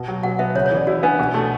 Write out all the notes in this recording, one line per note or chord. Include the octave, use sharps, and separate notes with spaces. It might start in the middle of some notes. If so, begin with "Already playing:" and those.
Already playing: B2
F#3
B2 F#5
B3 E5
C#3 C#5
C#5
E3
D5
E4 F#4
B3 D4
B2
A3